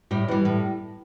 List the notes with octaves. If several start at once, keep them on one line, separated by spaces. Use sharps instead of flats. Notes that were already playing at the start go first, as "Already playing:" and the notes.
A2 G3
E3 G3
A2